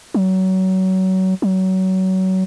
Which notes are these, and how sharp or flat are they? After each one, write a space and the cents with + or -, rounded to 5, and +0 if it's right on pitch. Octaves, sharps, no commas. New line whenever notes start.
F#3 +25
F#3 +25